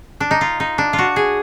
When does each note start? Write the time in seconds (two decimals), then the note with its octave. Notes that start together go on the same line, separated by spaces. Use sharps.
0.20 D4
0.31 D#4
0.41 F4
0.60 D#4
0.78 D4
0.93 F4
0.98 F#4
1.16 G#4